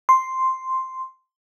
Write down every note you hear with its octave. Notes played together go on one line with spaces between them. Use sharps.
C6